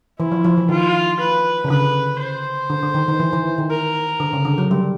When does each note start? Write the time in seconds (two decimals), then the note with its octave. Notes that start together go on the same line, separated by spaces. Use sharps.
0.19 E3 E4
0.32 F3
0.45 F3
0.57 E3
0.69 D#3 F4
1.20 B4
1.64 C#3
1.70 D3 B4
2.20 C5
2.70 D3
2.83 D3
2.94 D#3
3.08 D#3
3.20 E3
3.33 E3
3.58 D#3
3.70 A#4
4.20 D3
4.33 C#3
4.45 D3
4.58 F#3
4.71 G3